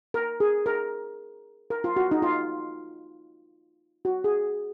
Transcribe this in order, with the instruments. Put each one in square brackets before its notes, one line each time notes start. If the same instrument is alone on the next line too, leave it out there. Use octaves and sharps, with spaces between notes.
[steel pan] A#4
G#4
A#4
A#4
F4
F#4
D#4
F4
F#4
G#4